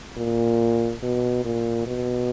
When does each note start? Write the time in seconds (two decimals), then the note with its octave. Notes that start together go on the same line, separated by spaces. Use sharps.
0.17 A#2
1.02 B2
1.45 A#2
1.87 B2